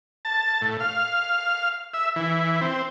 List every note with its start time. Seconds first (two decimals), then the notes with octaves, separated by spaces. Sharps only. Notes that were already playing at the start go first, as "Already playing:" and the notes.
0.25 A5
0.62 A2
0.80 F5
1.94 E5
2.16 E3
2.61 C4